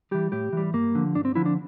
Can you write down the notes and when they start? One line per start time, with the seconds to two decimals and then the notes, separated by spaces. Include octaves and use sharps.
0.11 E3 G3 G4
0.32 A2 G4
0.53 E3 G3
0.74 G2 A#3
0.95 D3 F3
1.15 G2 D4
1.25 C4
1.35 D3 F3 E4
1.46 D4